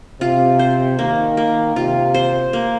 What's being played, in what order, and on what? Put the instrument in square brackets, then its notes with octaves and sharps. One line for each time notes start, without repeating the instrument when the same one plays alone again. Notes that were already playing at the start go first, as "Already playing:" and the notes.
[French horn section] C3 [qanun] F4
[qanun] C5
[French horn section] D#3 [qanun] A#3
[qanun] A#3
[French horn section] C3 [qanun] F4
[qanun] C5
A#3